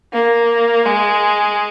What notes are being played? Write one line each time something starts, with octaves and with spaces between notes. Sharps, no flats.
A#3
G#3